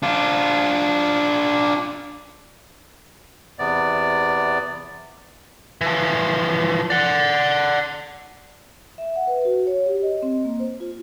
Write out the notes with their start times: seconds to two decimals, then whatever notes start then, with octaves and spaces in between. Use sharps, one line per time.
0.03 D4 F4
3.59 E2 C3 B3 D5
5.81 E3 F3
6.90 D5 F#5
8.98 E5
9.16 F#5
9.27 B4
9.45 F#4
9.67 C#5
9.86 G4
10.02 D#5
10.22 C4
10.45 A#3
10.59 C5
10.80 F4